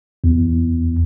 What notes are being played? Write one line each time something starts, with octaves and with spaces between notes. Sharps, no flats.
E2